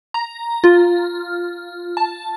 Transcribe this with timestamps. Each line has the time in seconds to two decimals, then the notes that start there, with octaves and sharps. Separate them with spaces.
0.14 A#5
0.64 F4
1.97 A5